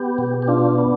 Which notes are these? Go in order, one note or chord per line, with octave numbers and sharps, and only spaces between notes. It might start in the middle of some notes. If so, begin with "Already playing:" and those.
Already playing: B3 G4
B2
G4
D4 F4
B3